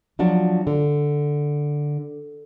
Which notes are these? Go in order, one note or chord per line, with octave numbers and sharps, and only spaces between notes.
F3 F#3 D4 F#4
D3